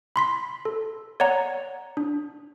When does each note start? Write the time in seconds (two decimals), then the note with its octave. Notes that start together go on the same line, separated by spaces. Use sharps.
0.16 B5 C6 B6
0.65 A4
1.20 C#5 D5 F#5 A#5
1.97 D4